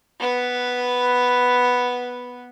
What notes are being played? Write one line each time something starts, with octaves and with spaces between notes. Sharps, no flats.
B3 B4